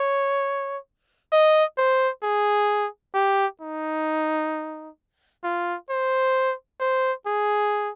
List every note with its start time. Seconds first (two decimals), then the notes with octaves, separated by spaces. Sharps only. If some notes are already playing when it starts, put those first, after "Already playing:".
Already playing: C#5
1.32 D#5
1.78 C5
2.23 G#4
3.14 G4
3.61 D#4
5.44 F4
5.90 C5
6.80 C5
7.27 G#4